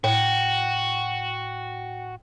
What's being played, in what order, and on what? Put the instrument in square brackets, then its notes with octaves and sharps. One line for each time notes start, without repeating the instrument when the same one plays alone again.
[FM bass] A2 [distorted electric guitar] F#4 [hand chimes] G5